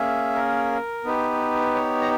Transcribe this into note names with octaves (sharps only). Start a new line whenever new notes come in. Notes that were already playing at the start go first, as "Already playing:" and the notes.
Already playing: A#3 C#4 G#4 E5
A#4
B3 D#4 G4 B4
C#5
A#5